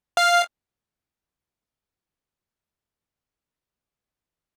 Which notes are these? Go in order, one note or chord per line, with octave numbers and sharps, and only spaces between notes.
F5